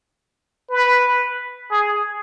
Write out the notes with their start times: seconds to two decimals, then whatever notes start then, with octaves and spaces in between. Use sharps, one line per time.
0.70 B4
1.71 G#4